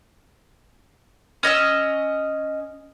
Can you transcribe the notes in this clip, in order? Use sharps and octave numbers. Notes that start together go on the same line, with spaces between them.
C#4 D#5 A5 E6